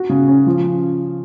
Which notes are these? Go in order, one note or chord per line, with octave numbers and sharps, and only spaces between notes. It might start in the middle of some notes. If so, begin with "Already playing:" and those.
Already playing: F#4
C#3
C#4
F3